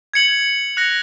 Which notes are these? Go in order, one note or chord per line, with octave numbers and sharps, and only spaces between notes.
G#6 C#7 F#7
F#6 A#6 C#7 F7